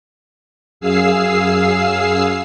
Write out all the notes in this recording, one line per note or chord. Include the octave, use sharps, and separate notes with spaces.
F#2 G#4 F5 E6 C7